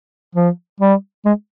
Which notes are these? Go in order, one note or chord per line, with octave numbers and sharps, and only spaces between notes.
F3
G3
G#3